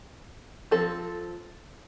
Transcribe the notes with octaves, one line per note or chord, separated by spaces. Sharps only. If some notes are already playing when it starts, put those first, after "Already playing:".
F3 C4 A4